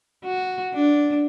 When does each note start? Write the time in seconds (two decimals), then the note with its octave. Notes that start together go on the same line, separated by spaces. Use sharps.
0.24 F#4
0.74 D4